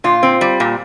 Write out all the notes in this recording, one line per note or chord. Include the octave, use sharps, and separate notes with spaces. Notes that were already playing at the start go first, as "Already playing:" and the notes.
A#2 F4
C4
G3
A#2